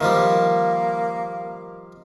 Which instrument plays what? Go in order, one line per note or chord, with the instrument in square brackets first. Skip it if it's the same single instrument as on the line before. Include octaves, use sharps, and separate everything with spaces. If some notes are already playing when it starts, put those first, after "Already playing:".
[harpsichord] D#3 F3 G3 [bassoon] A#3